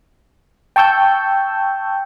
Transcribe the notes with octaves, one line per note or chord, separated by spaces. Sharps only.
G5 A5 C#6 E6 G6